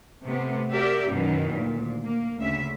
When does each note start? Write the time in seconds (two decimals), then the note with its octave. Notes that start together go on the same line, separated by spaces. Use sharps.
0.24 C3 A3 B3
0.73 F#4 G4 A#4 D5 E5
1.09 F#2 B2 D#3 E3 F#3
1.53 D2 A#2
2.04 A#3
2.39 D2 C#3 E5